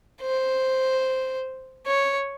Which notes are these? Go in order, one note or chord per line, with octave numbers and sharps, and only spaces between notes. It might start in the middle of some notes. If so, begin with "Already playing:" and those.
C5
C#5